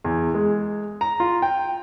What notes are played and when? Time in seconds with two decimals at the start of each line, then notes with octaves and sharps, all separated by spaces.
0.04 E2
0.34 G#3
1.01 A#5
1.20 F4
1.42 G5